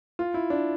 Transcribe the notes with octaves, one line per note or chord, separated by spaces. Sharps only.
F4
E4
D4